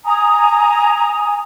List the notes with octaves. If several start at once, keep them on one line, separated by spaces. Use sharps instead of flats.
G#5 A#5 D#6